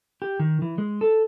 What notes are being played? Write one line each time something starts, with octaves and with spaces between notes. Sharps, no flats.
G4
D#3
E3
G#3
A4